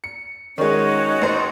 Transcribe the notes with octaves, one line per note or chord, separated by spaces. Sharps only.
C#7
D#3 G#3 C#4 D#4 F#4
A1 C5